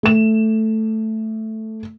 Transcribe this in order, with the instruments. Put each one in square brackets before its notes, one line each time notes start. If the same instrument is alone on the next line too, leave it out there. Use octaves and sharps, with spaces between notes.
[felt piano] A3 E7